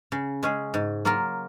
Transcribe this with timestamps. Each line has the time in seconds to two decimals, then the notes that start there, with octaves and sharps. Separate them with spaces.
0.12 C#3
0.43 G#3 C#4 G#4
0.74 G#2
1.05 F#3 A#3 F4 A#4